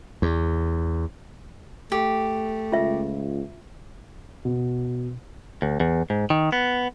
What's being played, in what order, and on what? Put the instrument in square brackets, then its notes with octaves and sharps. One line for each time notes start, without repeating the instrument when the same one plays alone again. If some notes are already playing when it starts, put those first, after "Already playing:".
[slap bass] E2
[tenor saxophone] A3 [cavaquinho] G4
[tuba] C#2 [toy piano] F4 E5
[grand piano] B2
[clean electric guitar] D2
E2
G#2
D#3
B3